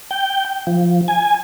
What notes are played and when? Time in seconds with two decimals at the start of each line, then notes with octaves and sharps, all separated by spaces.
0.11 G5
0.67 F3
1.08 G#5